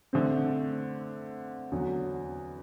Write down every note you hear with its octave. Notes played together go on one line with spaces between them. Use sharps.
D3 A3 C4
E2 D3 F#3